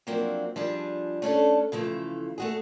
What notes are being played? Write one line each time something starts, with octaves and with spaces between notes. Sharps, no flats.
F3 F#3 A#3 C4 D4
F3 G3 D4 G#4
A3 C#4 D4 A4
C#3 E3 F3 A3
A3 F#4 G#4